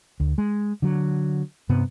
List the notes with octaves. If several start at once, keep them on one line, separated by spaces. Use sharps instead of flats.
D2
G#3
D3 F#3
G2 C3 B3